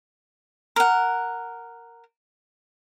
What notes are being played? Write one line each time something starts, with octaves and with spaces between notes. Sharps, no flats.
A#4 F#5